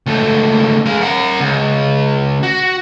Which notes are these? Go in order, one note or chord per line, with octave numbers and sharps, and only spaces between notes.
C#2 A3
G#3 F5
A#4 F#5
C#2
F#4